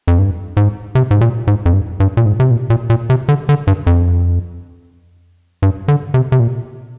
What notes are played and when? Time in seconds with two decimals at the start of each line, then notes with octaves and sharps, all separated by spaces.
0.08 F2
0.19 G2
0.57 G#2
0.95 C3
1.11 G#2
1.21 A#2
1.47 G#2
1.66 F2
1.73 G2
2.00 G2
2.17 A#2
2.26 G#2
2.40 C3
2.51 A#2
2.70 A#2
2.90 A#2
3.10 C3
3.29 D3
3.49 D3
3.67 G2
3.87 F2
5.62 G2
5.88 D3
6.14 C3
6.32 C3
6.40 A#2